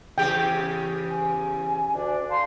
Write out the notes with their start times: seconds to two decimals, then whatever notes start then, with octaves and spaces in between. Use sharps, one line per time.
0.18 E2 C#3 G4 G5
1.10 G#5
1.94 D2 D4
2.30 D4 F5 A5 C6